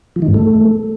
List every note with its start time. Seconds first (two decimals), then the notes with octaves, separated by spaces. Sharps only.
0.16 F3
0.22 D#3
0.28 G#2
0.34 A3